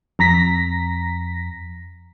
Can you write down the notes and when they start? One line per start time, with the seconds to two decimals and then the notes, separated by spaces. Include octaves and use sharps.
0.19 F2 A#5 A#6 B6